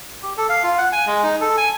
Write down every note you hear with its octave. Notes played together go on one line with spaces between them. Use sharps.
G4
A4
F5
F4
F#5
G#5
G#3
D#4
A4
G#5